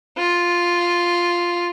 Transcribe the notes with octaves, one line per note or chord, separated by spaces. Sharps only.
F4